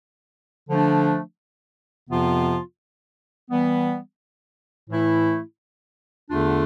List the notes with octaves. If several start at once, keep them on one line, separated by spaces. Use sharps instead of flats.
D3 F3 A3 D4
F2 C3 F3 B3 F4
E3 G3 B3
A2 E3 A3 E4
E2 D3 A3 D4 F4